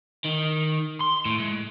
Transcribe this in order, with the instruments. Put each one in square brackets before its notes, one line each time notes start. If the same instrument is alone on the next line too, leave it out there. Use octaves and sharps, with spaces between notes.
[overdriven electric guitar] D#3
C6
A2
G#3